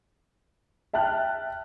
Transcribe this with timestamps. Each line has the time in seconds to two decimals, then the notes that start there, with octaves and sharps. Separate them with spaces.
0.93 E5 G5 A5 F6 F#6